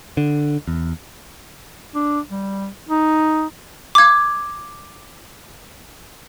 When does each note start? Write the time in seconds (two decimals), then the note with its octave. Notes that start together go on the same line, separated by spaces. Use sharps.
0.17 D3
0.68 E2
1.95 D4
2.31 G3
2.89 D#4
3.95 D6 G#6